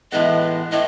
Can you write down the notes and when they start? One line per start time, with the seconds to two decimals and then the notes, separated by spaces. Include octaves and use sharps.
0.12 A2 E3 G#3 B3 D#5
0.72 A2 D#5